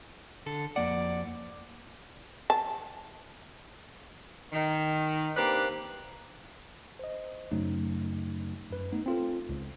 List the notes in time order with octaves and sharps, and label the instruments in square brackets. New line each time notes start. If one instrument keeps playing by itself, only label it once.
[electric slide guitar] D3 A4
[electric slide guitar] F2 A#3 F#5 [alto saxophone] D5
[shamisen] A5
[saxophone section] D#3
A#3 C4 D4 G4 B4
[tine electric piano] C5 D#5
F#2 C#3 F#3 A3 D#4
F#2 B4
A3 B3 D#4
C4 F4 A4
C#2